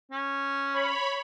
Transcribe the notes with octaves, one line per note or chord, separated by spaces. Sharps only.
C#4
C#5 B5